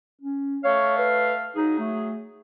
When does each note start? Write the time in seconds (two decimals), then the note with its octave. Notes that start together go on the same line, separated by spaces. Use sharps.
0.21 C#4
0.64 A3 C#5 F5
0.98 B4
1.56 F#3 D#4 G#4
1.78 A3